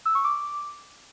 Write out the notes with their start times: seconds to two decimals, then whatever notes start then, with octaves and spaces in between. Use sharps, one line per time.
0.05 E6
0.15 C#6
0.24 D6